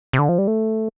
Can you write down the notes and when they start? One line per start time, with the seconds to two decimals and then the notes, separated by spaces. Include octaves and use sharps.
0.13 C3
0.19 D3
0.29 F3
0.38 G3
0.48 A3